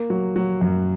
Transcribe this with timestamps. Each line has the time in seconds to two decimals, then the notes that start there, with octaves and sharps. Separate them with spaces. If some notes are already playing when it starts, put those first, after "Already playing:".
Already playing: A#3
0.10 F#3
0.36 F#3
0.61 F#2